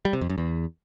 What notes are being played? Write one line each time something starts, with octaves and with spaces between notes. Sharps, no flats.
G3
C3
F2
F#2
E2